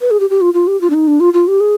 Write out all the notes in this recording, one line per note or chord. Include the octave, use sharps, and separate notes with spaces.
B4
G#4
G4
G4
F4
F4
G4
F4
D4
D#4
D4
F4
F4
G4
G#4